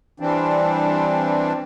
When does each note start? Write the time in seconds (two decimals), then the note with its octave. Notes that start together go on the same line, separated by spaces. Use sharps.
0.20 E3 G3 C4 D4